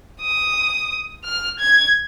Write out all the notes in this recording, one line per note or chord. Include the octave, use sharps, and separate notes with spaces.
D#6
F6
G#6